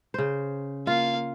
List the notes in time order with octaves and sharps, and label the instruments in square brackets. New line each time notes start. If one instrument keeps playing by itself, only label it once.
[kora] C#3 C5
[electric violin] A#3 F5 [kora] F4